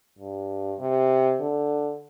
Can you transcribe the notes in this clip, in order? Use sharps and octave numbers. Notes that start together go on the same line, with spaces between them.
G2
C3
D3